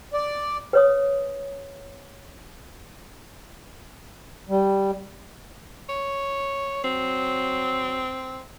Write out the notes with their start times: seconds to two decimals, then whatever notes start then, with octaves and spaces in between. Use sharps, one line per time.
0.14 D5
0.73 B4 C#5 D#6
4.49 G3
5.89 C#5
6.84 F#3 C4